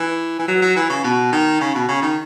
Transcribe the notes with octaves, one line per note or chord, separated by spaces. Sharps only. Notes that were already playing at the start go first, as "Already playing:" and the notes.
Already playing: E3
E3
F#3
F#3
E3
C#3
B2
D#3
C#3
B2
C#3
D#3